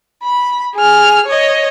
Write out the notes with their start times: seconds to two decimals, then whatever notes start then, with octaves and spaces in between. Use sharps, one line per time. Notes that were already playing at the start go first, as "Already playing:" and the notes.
0.23 B5
0.76 G#4 F6
1.27 C#5 D#5